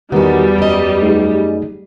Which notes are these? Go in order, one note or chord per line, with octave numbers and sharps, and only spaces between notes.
E2 D#3 G3 B3 F#4
F#2 D#5
A3 D#4 G#4